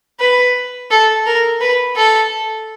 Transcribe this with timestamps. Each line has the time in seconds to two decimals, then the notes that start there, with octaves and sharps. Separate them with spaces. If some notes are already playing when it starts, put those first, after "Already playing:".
0.20 B4
0.91 A4
1.26 A#4
1.61 B4
1.96 A4